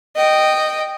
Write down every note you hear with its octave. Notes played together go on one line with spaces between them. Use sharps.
D#5 G5